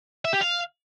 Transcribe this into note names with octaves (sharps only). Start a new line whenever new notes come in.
E5
G4
F5